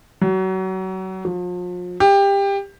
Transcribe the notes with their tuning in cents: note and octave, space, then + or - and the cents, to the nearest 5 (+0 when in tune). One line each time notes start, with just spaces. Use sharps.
F#3 +30
F3 +40
G4 +20